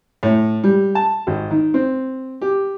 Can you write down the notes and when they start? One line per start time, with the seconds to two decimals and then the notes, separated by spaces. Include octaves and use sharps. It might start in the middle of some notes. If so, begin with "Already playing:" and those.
0.23 A2
0.64 G3
0.95 A5
1.27 G#1
1.51 D#3
1.74 C4
2.42 G4